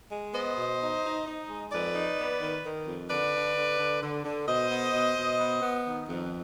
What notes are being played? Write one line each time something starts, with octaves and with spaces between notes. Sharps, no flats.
G#3
B3 C5 D#5
B2
D#4
D#4
D#4
G#3
F2 B4 D5
D#4
B3
D#3
D#3
F2
D3 B4 D5
D3
D3
D3
D3
D3
B2 C5 D#5
B3
B2
B2
B3
B3
D#3
F2